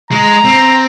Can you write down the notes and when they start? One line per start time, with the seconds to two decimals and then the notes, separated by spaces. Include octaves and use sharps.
0.11 G#3 A#5
0.45 C4